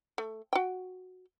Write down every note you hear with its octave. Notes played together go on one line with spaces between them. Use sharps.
A3
F#4 G5